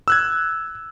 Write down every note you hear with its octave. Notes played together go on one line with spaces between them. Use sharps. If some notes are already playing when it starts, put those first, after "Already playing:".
E6 F#6 G#6